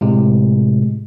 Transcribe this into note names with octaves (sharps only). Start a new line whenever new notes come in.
A2 C3 G#3